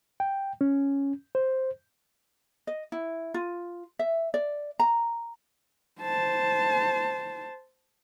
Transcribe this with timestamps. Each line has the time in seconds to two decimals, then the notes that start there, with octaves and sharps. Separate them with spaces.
0.20 G5
0.61 C#4
1.35 C5
2.67 D#5
2.92 E4
3.34 F4
3.99 E5
4.34 D5
4.80 A#5
6.02 C5 A5